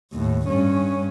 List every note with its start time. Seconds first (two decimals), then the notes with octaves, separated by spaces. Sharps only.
0.13 D#2 A2
0.48 G2 C#4